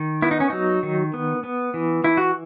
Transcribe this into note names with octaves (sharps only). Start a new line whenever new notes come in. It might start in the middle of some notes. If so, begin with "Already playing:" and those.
Already playing: D#3
B3 E4
D#4
C#4
F#3 D#4
D#3
B3
B3
E3
E3 E4
F#4